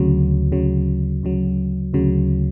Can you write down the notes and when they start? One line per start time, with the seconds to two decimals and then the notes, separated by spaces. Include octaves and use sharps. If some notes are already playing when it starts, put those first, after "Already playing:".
Already playing: D2 C#3 F#3
0.52 D2 C#3 F#3
1.23 D2 C#3 F#3
1.94 D2 C#3 F#3